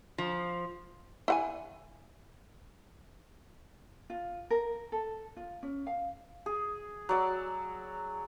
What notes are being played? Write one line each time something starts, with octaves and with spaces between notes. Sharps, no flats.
F3
E4 F#5 G#5
F4
A#4
A4
F4
C#4
F5
G#4
F#3 D5 E6